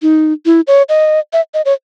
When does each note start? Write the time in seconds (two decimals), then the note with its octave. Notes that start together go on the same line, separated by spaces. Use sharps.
0.02 D#4
0.46 E4
0.67 C#5
0.89 D#5
1.33 E5
1.54 D#5
1.65 C#5